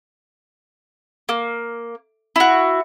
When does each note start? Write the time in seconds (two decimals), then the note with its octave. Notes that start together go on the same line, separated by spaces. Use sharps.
1.29 A#3
2.36 E4 F#4